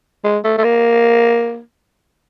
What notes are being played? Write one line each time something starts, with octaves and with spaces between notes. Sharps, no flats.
G#3
A3
A3
A#3